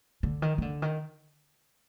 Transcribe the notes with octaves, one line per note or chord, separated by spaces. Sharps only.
D3
D#3
D#3
D3
D#3